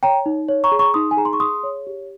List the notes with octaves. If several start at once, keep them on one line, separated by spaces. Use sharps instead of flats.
C#5 G5 A#5
D#4
C#5
A#5 C#6
G#4
A#5 C#6
D#4 C6 D#6
G#5
G#4 A#5
C6
C#6
G#4 C6 D#6
C#5
G4